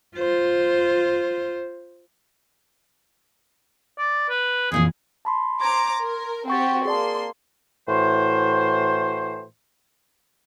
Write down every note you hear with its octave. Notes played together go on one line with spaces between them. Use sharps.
F4 C5
D5
B4
F2 A#2 E3 G#4
A5 B5 C6
C5 A#5 C6 D6 G#6
A#4
C4 F#4 G4 G5 C#6 A6
A#3 G#4 D5 A5 C6
A2 E3 F#4 C5